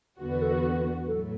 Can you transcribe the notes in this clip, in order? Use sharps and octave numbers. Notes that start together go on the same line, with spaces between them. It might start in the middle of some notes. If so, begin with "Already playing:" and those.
E2 D3 B3 F#4
B4
A4
B4
A2 F#3 A4